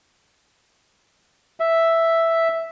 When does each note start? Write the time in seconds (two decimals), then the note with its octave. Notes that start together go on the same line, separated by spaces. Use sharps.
1.60 E5